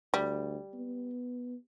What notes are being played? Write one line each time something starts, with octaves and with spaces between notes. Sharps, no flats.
D2 G3
B3